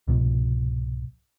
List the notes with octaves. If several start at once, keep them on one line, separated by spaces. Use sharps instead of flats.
C2 G#2 B2 F3